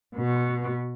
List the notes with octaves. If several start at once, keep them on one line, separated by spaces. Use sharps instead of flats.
B2